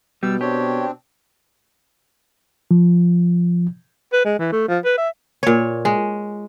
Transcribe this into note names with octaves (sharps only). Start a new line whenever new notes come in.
B2 G3 E6
C4 D4 G4 C#5
F3
B4
G#3
E3
A3
F3
B4
E5
A#2 C#5
G#3